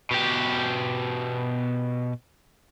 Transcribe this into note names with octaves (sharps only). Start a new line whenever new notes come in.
B2 G4